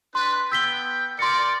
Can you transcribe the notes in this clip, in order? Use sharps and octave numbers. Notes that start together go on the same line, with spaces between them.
D4 B4 C6
B3 G5 E6 B6 G7
A#4 D5 C6 C#7